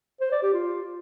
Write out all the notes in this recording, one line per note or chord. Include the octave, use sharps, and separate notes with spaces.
C5
D5
G4
F4